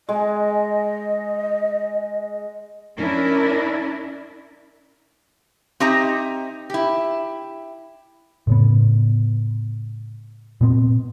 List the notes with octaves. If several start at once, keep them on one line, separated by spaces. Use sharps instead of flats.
G#3 D#5 G#5
C#4 D4 E4 A#4
C4 D#4 G4 D#5 E5 A#5
E4 G4
A2 C#3 B3
A#2 B3 C4